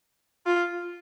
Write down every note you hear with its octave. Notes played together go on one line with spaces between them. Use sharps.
F4